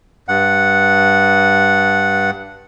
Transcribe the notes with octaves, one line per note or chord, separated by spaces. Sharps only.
G2 F#5